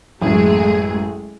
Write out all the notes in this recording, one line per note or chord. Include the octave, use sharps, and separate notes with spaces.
A1 F#2 G#3 A3 G#4